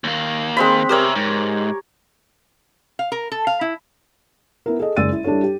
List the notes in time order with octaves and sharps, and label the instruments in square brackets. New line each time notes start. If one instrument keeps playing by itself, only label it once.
[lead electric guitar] D#2 A#3
[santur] G#3 C4 B5
[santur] G4 A#4 C#5 [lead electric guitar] C5 E5
[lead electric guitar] G#2
[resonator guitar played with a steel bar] F5
A#4
A4
F5
E4
[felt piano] B3 E4 A#4
G#4 A4 D#5
F#1 G#3 D5 E6 A6 D#7
E4
G3 D4 E4 A4 C#5
G4